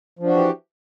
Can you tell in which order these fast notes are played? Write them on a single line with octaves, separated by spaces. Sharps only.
F3 D4 F#4 E3 G4